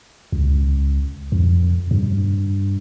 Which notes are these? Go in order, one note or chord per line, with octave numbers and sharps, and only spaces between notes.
C#2
F2
G2